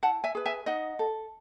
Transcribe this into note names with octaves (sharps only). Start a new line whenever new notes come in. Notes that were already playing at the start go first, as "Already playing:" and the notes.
E4 F#5 A5
E5 G#5
G#4 B4
E5 G#5
D#4 D#5 F#5
A4